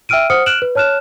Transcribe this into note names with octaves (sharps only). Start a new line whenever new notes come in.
E5 G5 E6 F6 D7 D#7
C5 F#5 D#6 F6 C#7
F6 F#6 D7 E7 F#7
B4
C#5 A5 F6 F#6 E7